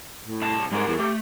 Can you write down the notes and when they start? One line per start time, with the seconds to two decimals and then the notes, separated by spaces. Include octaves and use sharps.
0.25 A2
0.42 C2 A5
0.71 G#2 G3 A#4
0.87 E2
0.99 A3 G4